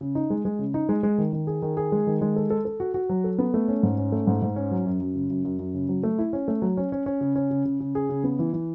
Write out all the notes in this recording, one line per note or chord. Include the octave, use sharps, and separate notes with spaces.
C#3
D#4
G#3
G#3
C#3
D#4
G#3
G#3
D#3
D#3
G#4
D#3
G#4
G#3
D#3
G#3
A4
A4
A4
F#4
F#4
F#3
A4
B3
A3
C#4
G#2
C#4
A3
G#2
G#2
C#4
F#3
F#2
F#2
C#3
F#2
F#2
F#2
C#3
F#3
A3
E4
C#4
A3
F#3
C#4
C#4
C#4
C#3
C#4
C#3
C#3
C#3
G#4
C#3
B3
E3
E3